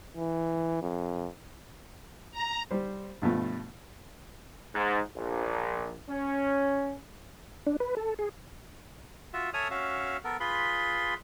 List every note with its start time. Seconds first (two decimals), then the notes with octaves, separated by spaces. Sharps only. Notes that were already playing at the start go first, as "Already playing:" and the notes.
0.17 E3
0.82 F2
2.31 A#5
2.71 G3 C5
3.22 G2 B2 F3 A3
4.75 G#2
5.16 A#1
6.09 C#4
7.67 D4
7.80 B4
7.97 A4
8.19 G#4
9.33 F4 F#4 E5
9.54 A4 C#5 E5 G#5 D#6 F6
9.71 C#4 F#4 E5 F5
10.24 B3 A4 A#4
10.40 F4 G#4 B4 B5 C6